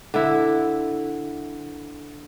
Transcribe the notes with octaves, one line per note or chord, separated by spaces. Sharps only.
D3 E4